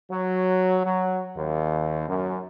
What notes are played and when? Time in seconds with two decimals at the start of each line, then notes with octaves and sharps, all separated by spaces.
0.11 F#3
0.86 F#3
1.37 D#2
2.09 F#2